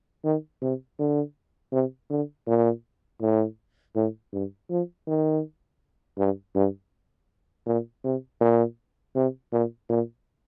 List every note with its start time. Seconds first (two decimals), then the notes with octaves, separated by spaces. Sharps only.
0.24 D#3
0.61 C3
0.99 D3
1.73 C3
2.10 D3
2.47 A#2
3.21 A2
3.95 A2
4.32 G2
4.70 F3
5.07 D#3
6.18 G2
6.55 G2
7.66 A#2
8.04 C3
8.41 A#2
9.15 C3
9.52 A#2
9.89 A#2